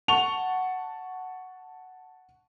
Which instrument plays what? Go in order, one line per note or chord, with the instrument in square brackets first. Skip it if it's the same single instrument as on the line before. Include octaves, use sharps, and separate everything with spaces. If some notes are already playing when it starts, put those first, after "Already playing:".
[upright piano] F#5 A5 C#6 F7 G7